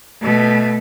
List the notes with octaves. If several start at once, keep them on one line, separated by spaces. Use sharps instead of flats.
B2 A3